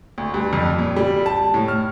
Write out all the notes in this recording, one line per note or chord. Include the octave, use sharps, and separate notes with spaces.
D2
G2
F2
A#2
G3
A5
A2
F6